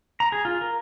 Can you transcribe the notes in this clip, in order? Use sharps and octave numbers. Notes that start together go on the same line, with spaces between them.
A#5
G#4
F4
A#4